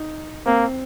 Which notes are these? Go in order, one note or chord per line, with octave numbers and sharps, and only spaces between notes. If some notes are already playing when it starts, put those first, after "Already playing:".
Already playing: D#4
A#3 C4